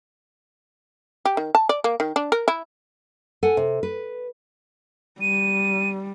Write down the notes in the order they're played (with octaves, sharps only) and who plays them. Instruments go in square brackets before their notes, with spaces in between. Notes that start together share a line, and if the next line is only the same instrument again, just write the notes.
[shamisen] G4
D#3
A5
D5
A#3
D#3
D4
A#4
E4
[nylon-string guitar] A4 F#5 G#5
C3
B4
[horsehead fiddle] G3 [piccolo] D#7